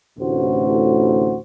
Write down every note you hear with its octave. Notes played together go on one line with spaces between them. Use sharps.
A1 D2 A2 C3 F#4 C5